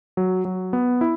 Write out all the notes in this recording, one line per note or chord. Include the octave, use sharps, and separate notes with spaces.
F#3
F#3
B3
E4